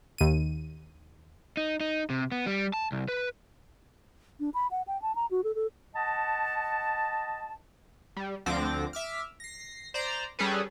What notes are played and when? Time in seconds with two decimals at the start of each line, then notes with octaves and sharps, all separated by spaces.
0.18 D#2 D#7
1.57 D#4
1.80 D#4
2.10 C3
2.32 B3
2.47 G3
2.74 A5
2.92 C2
3.08 B4
4.40 D4
4.54 B5
4.71 F#5
4.87 G5
5.02 A5
5.15 A#5
5.31 F#4
5.44 A4
5.55 A4
5.95 D#5 F#5 A5
8.17 G3
8.46 D2 D3 F3 C4 D6 A#6
8.93 E5 D6 F6
9.40 A#6 C7
9.94 C5 D5 A#5
10.39 G3 C#4 G#4 A4 B4